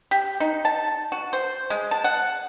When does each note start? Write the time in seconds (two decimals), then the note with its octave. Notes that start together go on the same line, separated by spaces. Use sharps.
0.11 G4
0.40 D#4
0.65 A5
1.12 F#4
1.33 C5
1.70 G#3
1.91 A5
2.04 F#5